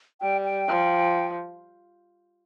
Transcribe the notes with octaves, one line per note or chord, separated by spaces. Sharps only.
G3 G5
G5
F3